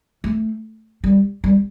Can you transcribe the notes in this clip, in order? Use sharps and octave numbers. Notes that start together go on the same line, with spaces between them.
A3
G3
G3